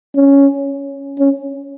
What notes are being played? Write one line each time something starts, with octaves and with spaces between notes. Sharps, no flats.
C#4
C#4